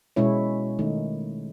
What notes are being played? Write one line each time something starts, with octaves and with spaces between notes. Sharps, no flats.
B2 G#3 C#4 E4 C#5
D#3 A3 D#4